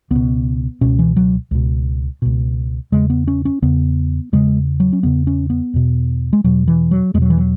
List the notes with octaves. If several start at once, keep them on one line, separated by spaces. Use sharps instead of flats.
C#2 B2 B3
C#2 B2 C#4
E3
F#3
C#2 B2
C#2 B2
E2 C#3 G#3
B3
C#4
C#4
E2 C#3 B3
E2 C#3 G#3
F#3
C#4
E2 C#3 B3
C#4
B3
E2 B2
G#3
E2 B2 F#3
E3
F#3
E2 B2 F#3 G#3
E3
F#3